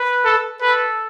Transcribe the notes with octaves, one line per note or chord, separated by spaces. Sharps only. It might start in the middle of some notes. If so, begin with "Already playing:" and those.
Already playing: B4
A4
A4 B4